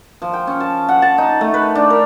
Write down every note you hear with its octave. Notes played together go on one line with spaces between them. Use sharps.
F3
G5
C#4
A5
F#5
A5
D#4
A3
B4
D4
A#4